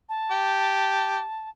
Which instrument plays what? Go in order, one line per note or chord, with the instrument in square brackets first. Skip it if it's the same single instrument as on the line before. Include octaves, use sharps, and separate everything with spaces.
[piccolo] A5
[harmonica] G4